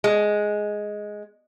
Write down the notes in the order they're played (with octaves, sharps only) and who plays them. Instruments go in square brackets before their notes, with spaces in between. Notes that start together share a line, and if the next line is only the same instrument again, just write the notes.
[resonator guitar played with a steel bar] G#3